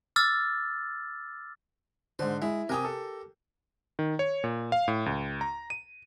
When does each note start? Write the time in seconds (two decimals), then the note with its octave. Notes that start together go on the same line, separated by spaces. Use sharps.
0.16 D6 E6 F6 A6
2.19 G#2 D3 C5
2.42 G#3 E4
2.69 C3 G4 A#4 G#5 D#6
2.85 A4
3.99 D#3
4.19 C#5
4.44 A#2
4.72 F5
4.88 A2
5.06 C#2
5.41 A#5
5.70 D#7